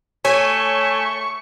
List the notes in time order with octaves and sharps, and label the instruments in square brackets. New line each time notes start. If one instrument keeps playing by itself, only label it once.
[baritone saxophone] A3 [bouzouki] C#5 [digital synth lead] G#5 [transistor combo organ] C#6